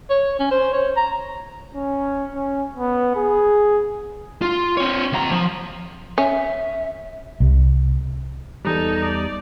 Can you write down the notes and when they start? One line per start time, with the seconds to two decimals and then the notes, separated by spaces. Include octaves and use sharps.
0.10 C#5
0.39 C#4
0.51 C5
0.73 C#5
0.97 A#5
1.74 C#4
2.34 C#4
2.76 B3
3.16 G#4
4.42 F4
4.77 C4 C#5
5.13 D#2 A#5
5.31 F3
6.18 C#4 E5
7.40 C2
8.65 E2 G3 D#4 A4
9.04 D5